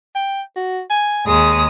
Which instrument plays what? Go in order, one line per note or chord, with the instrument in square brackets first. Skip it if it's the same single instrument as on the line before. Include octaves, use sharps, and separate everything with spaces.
[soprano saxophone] G5
F#4
G#5
[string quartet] D#2 G#3 D#6 [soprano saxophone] G#4